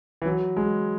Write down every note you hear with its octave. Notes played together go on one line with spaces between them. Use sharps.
E3
F#3
G#3